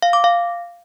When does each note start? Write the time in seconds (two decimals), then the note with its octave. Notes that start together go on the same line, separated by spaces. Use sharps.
0.02 F5
0.13 D6
0.24 F5